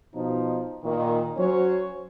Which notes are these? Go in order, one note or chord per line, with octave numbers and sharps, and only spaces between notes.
B2 F3 D#4
A#2 D#3
F#3 C#4 C5 C#5